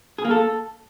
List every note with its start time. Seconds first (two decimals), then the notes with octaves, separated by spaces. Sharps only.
0.18 G#4
0.25 A#3
0.31 A4